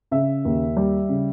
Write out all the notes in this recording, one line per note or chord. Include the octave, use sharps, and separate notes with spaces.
C#3 E5
D#2
G3
C#3